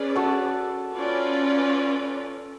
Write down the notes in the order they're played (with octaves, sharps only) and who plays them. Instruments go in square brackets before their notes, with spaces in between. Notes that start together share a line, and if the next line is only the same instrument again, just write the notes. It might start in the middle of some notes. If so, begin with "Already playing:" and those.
Already playing: [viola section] C#4 G#4 B4 D5
[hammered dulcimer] F#4 A4
[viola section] C#4 F4 B4 D5